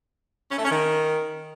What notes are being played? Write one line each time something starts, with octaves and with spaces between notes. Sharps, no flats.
C#4
A3
C#4
D#3